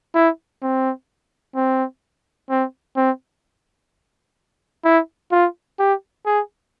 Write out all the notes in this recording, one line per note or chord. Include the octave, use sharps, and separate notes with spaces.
E4
C4
C4
C4
C4
E4
F4
G4
G#4